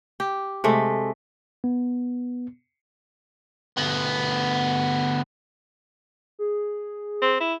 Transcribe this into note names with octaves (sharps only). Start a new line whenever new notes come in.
G4
C3 G#3 A3
B3
D2 B3
G#4
C4
E4